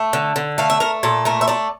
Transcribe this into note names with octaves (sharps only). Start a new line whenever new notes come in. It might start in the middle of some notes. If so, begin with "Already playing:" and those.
Already playing: A3
D3
D3
A3 F5
E5
A3 A#4
A#2 A4
A3 A#4
E5
A3 D5